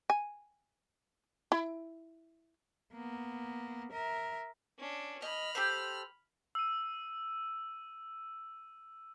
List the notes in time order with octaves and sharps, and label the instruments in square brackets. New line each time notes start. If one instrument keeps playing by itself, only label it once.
[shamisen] G#5
E4
[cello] A#3 B3
A#4 E5
[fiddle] C#4 D4
[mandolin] D#5 [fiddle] B5 F6
[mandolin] G4 A4 C5
[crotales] E6 D#7